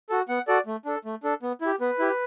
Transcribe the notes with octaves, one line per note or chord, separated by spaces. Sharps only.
F#4 A4
B3 F#5
F#4 A4 D5
A3
D4 A4
A3
D4 A4
B3
E4 G4
B3 B4
E4 G4